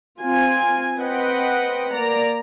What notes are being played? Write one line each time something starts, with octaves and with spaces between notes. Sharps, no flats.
C4 F4 G#5
C4 B4 D#5 F#5 G5
A#3 D5 A#5